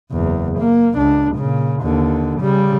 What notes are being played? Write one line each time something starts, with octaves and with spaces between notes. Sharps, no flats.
F#1 E2
A#3
C#2 D4
A#2 C#3
D#2 D3
C#3 G3